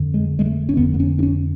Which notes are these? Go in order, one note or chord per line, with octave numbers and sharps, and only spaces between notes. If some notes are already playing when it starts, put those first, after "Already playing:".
Already playing: F2 D3
G#3
G#3
A3
C#4
F2 D3 B3
B3
C#4
D4
C#4